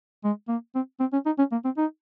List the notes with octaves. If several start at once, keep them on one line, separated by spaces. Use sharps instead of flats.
G#3
A#3
C4
C4
C#4
D#4
C#4
A#3
C4
D#4